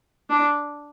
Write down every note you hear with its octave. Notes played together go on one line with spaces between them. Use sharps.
D4